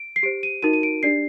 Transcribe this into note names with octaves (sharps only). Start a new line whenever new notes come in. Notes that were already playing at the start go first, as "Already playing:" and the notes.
Already playing: D7
C7
G4 C5 D7
D#7
D#4 F#4 A#4 D#7
D#7
D7
D4 G4 D5 C7